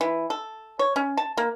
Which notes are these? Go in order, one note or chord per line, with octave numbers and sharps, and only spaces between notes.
E3
A4
C#5
C#4
A5
A#3